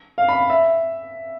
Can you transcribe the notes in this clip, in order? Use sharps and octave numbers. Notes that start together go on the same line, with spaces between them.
F5
B5
E5